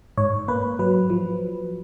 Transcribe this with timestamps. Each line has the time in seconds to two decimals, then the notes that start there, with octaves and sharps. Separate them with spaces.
0.17 G#2 C#5
0.48 A#3 B4
0.79 F#3 B4
1.10 F3